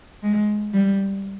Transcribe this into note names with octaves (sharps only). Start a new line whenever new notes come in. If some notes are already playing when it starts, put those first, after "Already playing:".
G#3
G3